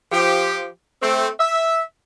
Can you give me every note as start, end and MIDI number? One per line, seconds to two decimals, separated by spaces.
0.12 0.66 53
0.12 0.66 67
1.02 1.28 57
1.02 1.28 60
1.40 1.81 76